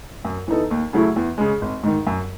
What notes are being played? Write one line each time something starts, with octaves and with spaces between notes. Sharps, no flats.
F#2
E3 B3 D#4 A4
D#2
C#3 F#3 A3 E4
E2
C#3 G#3
G#1
G#2 D#3
F#2